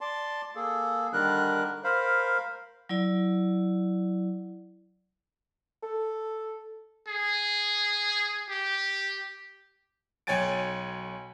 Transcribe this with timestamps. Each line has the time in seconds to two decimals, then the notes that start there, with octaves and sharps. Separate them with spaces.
0.01 D5 A5 C6
0.55 A#3 G#4 A4
1.13 D3 D#3 G3 D4 A#4 F#6
1.84 A#4 C5 F5 B5
2.89 F#3 E4 D5
5.83 A4
7.08 G#4
8.50 G4
10.27 B1 C#5 G5 G#5 A6 D7